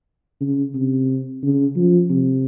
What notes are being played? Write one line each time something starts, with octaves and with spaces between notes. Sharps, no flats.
C#3
C3
C#3
F3
C3